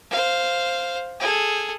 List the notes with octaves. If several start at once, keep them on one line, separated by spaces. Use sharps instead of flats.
C5 F5
G#4 A4